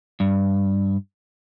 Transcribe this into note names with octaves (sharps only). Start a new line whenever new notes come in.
G2